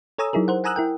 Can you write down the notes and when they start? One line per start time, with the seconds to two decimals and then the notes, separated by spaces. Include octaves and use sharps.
0.18 A4 C#5 G#5 A#5 D#6 E6
0.33 F#3 D#4 E4 G#4 A#4
0.48 A#4 C5 F#5
0.64 F#5 G#5 A#5 D#6 E6 F#6
0.76 E4 A#4 G5